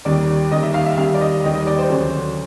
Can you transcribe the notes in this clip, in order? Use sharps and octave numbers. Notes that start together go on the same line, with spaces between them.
D#2 D#3 G3 D5
D#2 D#3 G3 D#5
E5
F5
E5
D#2 D#3 G3 F5
D5
D#5
D#2 D#3 G3 D#5
D#5
D5
C5
D2 C#3 F#3